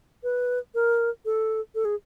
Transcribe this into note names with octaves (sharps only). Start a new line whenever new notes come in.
B4
A#4
A4
A4
G#4